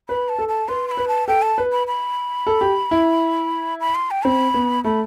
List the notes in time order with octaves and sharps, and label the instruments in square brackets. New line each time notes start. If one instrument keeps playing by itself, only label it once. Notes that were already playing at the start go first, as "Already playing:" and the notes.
[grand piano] B4 [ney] B5
[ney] A5
[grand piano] A4
[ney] A5
[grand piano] B4 [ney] C6
[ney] C6
B5
[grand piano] B4
[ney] A5
[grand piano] A4 [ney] G5
[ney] A5
[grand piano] B4
[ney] B5
B5
[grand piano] A4
G4
E4
[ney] B5
C6
G5
[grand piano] C4 [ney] B5
[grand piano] B3
[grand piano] A3 [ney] B5